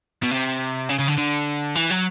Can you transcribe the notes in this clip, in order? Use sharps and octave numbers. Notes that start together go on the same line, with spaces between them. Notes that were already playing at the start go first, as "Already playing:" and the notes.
B2
C3
C#3
C#3
D3
D3
E3
F#3